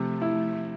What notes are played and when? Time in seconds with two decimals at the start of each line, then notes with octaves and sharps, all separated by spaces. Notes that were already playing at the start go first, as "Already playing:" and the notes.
Already playing: C3 F3 A3
0.22 E4